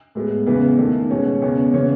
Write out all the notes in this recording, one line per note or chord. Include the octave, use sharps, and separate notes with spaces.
A2 G#3 B3
E2 C#3 E3 B3 B4
E2 D#3 A3
B2 G#3 B3 C#4 C#5
E2 C#3 G#3 B3 C#4 C#5
C#3 E3 B3 C#4 C#5